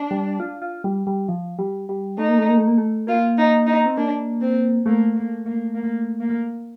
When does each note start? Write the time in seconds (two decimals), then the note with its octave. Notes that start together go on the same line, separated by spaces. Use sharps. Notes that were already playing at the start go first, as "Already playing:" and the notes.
Already playing: D4
0.11 G3
0.40 F4
0.62 F4
0.84 G3
1.07 G3
1.29 F3
1.59 G3
1.89 G3
2.18 A3 D#4
2.29 A#3
2.38 A3
2.49 A#3
2.58 A3
2.67 A#3
2.78 A3
3.07 A#3 F4
3.38 D#4
3.66 D#4
3.86 C4
3.96 A#3 D4
4.41 C4
4.86 A3 A#3
5.16 A#3
5.46 A#3
5.75 A#3
6.20 A#3